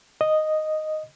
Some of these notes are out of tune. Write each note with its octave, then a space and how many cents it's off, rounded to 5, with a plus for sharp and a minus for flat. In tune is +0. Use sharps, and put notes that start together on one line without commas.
D#5 -5